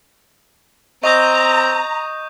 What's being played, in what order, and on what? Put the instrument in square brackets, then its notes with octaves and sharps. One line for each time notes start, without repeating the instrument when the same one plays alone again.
[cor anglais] C4 [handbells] D#5 [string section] A#5 [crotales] C#6 D#6 G6